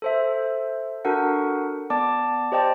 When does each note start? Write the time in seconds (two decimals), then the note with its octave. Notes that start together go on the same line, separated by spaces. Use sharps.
0.02 A4 C5 E5
1.05 D4 F#4 A4 A#4 F#5
1.90 B3 D5 A5 D6
2.52 G4 C5 D5 D#5 G5 A5